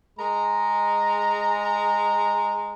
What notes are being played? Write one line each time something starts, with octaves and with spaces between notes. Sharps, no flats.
G#3 A#5